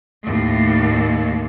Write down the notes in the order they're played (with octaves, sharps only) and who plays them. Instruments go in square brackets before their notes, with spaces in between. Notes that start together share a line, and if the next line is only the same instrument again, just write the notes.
[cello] D#2 A2